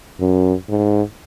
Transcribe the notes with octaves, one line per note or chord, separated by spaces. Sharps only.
F#2
G#2